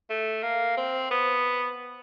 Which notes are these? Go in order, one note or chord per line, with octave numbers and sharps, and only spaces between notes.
A3
A#3
C4
B3